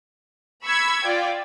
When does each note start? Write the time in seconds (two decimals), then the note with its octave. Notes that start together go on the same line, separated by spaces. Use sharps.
0.64 B5 C#6 E6 G#6
1.03 F4 D5 G5